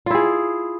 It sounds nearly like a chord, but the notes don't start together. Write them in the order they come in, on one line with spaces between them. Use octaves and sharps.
F4 E4 G#4